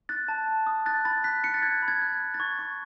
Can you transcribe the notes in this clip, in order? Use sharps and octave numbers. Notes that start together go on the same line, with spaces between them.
F#6 A6
A5
A5
D#6
F#6 A6
B5 A6
F#6 B6
F#6 C#7
A6
F#6 G#6
B5
G#6
F#6
F#6
A6
C#6 G#6
C#6